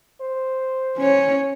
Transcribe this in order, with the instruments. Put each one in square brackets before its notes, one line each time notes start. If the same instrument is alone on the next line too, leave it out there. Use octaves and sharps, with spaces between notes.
[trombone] C5
[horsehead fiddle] C#4 C#5